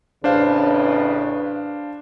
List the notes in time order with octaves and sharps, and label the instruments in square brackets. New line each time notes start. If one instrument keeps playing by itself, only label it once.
[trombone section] A1 C#3 B4 [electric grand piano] D4 C5 F5